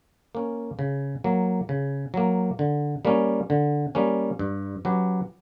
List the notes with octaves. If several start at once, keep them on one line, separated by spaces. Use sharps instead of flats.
A#3 C#4
C#3
F#3 A#3
C#3
F#3 A#3
D3
G3 A#3 C#4
D3
G3 A#3 C#4
G2
F#3 C#4 G4 B4